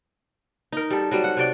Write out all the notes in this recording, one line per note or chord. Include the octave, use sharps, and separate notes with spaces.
D#4 A#4
G3 A4
F#3 G3 C4
F#5
C3 C#5 D5 G5